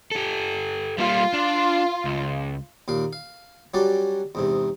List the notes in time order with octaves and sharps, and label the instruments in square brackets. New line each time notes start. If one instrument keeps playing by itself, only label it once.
[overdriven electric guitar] G4 A4
[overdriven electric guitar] G3 A#3 [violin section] F4
[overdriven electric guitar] D4
C#2
[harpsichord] D#2 A#2 F5
F5
F#3 G3 C#4 F#4 D5
E2 G#2 C3